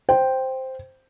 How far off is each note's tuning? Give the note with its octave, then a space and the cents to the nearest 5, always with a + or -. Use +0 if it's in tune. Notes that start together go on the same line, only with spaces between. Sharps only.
C5 +0 G5 +0